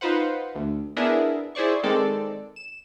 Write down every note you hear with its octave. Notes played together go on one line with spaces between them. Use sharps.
D#4 F4 B4 C5 F#5
D2
B3 D4 E4 G#4 A#4 E5
E4 G#4 C5 D5 C#6
D#3 G#3 C4 A4 D5
E7